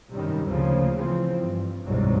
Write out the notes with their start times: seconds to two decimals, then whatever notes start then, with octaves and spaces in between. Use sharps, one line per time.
0.13 F#2 C3 D#3 G3
0.48 D2 C#3 F3 A#3
0.95 C#3 E3 F3 C4
1.37 G2
1.86 G1 C2 G#2 B2 D#3 F#3